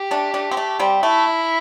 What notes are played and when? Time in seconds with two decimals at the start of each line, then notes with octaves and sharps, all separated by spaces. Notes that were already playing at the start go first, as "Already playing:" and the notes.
Already playing: G4
0.11 A3 D4
0.34 A3 D4
0.51 C4
0.57 A3
0.79 G3 C4
1.03 A3 E4